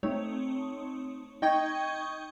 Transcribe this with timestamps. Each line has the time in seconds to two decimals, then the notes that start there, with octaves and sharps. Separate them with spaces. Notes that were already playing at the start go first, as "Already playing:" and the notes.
0.03 A3 C4 D#4 C#5
1.42 D#4 D#5 G5 C#6 G6 G#6